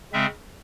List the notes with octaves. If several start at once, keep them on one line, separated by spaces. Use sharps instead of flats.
C#3 G#3 C4 E5